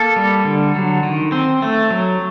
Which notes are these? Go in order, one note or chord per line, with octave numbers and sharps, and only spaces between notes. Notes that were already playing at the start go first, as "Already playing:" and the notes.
Already playing: A#3 A4
G3
D3
F#3
D#3
C4
A3
F#3